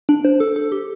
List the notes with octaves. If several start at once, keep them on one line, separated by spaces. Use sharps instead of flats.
D4
C5
A4
A4
G4